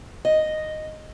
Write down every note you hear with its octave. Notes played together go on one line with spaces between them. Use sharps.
D#5